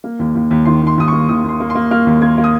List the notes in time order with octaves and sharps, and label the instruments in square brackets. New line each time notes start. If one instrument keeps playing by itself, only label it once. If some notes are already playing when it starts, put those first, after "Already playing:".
[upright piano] A#3
D#2
D#2
D#2
D#3 C6
D#2
C6
D#2 D#6
A#3 C#6
D#2 D#6
D#2
C6
A#3
C6
A#3
A#3 F6
D#2
A#3 G#6
A#3
D#6